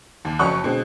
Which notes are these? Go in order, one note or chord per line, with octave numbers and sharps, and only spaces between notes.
D#2
F#1 F2 C#4 F#4 C#6 F#6
B2 D3 G#3 C4